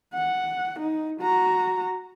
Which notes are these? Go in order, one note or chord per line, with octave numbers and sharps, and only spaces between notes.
F#5
D#4
F#4 A#5